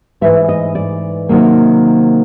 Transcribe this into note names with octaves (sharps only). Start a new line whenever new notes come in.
G#2 E3 A3 E5
D#5
D5
C3 D#3 F#3 A#3